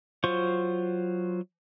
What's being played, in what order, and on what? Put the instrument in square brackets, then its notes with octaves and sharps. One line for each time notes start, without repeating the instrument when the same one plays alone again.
[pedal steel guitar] F#3 F4 C5 C#6